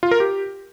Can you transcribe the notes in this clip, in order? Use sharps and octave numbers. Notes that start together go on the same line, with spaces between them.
F4
A#4
G4